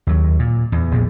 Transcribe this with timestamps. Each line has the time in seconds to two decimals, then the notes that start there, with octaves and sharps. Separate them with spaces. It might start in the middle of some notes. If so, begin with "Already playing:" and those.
0.07 D#2 F#3
0.39 A#2
0.72 E2
0.91 A#1 E2 A#2